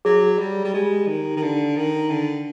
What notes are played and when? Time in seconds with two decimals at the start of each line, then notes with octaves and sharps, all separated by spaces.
0.05 F#3 G#4
0.39 G3
0.65 G3
0.74 G#3 G4
1.07 D#3
1.37 D#3
1.43 D3
1.77 D#3
2.10 D3